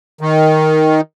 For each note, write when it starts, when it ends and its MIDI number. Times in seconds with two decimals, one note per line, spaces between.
0.21 1.01 51